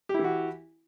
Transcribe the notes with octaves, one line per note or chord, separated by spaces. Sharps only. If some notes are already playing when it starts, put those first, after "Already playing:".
E3 E4 F#4 G4